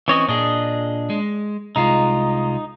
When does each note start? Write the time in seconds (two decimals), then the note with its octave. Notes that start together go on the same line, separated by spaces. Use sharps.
0.08 E3 C4 C#4 C#5 D#5
0.28 A#2 D4 G#4 D#5
1.10 G#3
1.76 C2 G#3 D#4 F4